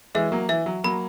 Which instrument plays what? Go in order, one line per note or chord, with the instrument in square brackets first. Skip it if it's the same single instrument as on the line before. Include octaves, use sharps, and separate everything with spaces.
[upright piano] E3 G#3 [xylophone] E5
[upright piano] F#3 A#3
[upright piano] E3 [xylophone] E5
[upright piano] F#3
[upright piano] F#3 A#3 [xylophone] B5